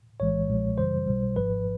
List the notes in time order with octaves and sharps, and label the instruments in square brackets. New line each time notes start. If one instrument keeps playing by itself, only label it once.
[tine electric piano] B1 A2 E3 G#3 C#5
B1 A#2 F3 G#3
F#2 C#3 E3 G3 C5
B1 B2 G3
G#1 G#2 F3 B4